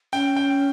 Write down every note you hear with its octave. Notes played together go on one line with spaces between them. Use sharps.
C#4 G5
G5